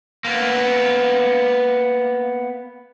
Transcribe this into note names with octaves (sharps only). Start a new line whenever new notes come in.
A#3 B3